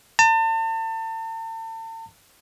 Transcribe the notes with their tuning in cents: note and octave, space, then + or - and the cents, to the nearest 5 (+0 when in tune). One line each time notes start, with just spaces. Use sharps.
A5 +40